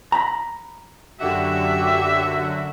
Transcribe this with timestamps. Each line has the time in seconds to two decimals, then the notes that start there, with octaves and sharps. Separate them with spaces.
0.12 A#5 B5
1.20 F#2 D3 F#4 G4 E5